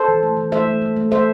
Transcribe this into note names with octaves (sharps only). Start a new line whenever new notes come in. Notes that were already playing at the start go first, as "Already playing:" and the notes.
Already playing: A4 C5
E3
A3
E3
A3 C5 E5
A3
A3
A3
A3 C5 E5